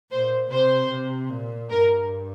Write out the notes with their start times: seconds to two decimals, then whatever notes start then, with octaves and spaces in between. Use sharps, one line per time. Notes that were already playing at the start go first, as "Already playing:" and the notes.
0.11 A#2 C5
0.50 C3 C5
0.90 C3
1.30 A#2
1.69 G2 A#4